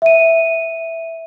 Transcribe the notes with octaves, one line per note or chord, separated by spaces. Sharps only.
E5 D#7